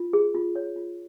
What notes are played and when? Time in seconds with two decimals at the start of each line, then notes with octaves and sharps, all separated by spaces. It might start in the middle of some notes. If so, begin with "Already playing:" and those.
Already playing: F4
0.13 G#4
0.35 F4
0.55 C#5
0.76 F4